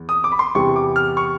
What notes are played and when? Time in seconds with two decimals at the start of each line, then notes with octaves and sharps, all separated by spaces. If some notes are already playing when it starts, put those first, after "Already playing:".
Already playing: E2
0.09 D#6
0.24 D6
0.32 B5
0.39 C6
0.55 E2 C3 E3 G3 C#6
0.76 D6
0.96 F6
1.17 C#6